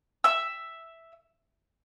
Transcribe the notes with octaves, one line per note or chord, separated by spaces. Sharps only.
E5 E6